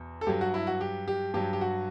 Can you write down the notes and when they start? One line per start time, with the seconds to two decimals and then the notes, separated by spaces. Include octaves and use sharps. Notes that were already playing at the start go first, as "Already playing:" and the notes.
Already playing: E2 B2
0.21 A4
0.27 G2 F#3 G4
0.41 F#4
0.54 E4
0.67 F#4
0.81 G4
1.08 G4
1.34 G2 F#3 G4
1.53 G4
1.61 F#4